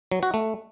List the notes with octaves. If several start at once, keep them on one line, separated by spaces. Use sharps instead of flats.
F#3
F#4
A3